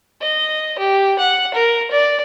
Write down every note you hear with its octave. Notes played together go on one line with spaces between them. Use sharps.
D#5
G4
F#5
A#4
D5